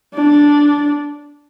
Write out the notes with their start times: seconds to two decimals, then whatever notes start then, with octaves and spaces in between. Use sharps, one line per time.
0.14 D4